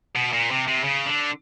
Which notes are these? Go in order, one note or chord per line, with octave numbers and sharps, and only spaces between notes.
B2
A#2
C3
C3
C#3
D3